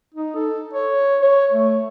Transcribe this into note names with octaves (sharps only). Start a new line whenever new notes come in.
D#4
A4
C#5
C#5
A3